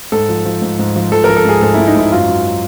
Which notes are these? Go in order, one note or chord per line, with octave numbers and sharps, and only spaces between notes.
G#2 A4
F3
F3
G#2
G#2
F3
F3 A4
F3 A#4
A4
G#2 G#4
G#2 A4
G#2 E4
D#4
G#2 E4
F#2 F4
F#3